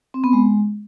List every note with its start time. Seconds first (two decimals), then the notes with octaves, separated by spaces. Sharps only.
0.14 C4
0.24 B3
0.33 G#3